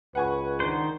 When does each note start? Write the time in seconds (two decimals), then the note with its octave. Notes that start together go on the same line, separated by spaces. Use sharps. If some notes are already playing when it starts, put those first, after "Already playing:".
0.15 C#2 B4 F#5 G#5 C#6
0.60 D#3 D4 C5